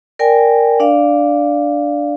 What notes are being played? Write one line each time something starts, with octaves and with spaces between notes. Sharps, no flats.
A#4 D5 G5 G#5
D4 D5 F5